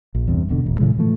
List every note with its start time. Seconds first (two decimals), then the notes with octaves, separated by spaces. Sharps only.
0.15 A#1
0.28 E2 G2 C3
0.49 E1 B2 D3
0.64 D#1 A1
0.78 A2 C#3 E3 G#3
0.98 A2 E3 F3 A3